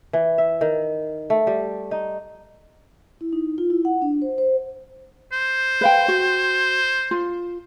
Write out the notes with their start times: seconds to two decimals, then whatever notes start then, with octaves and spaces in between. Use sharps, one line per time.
0.13 E3
0.38 E5
0.61 D#3
1.30 A3
1.47 G3
1.91 D#4
3.21 E4
3.33 D#4
3.58 F4
3.70 E4
3.85 F#5
4.02 D4
4.22 C5
4.38 C5
5.32 C5
5.81 B4 F5 G5
6.08 F#4
7.11 F4